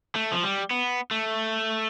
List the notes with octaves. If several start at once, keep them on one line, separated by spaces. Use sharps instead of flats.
A3
F3
G3
B3
A3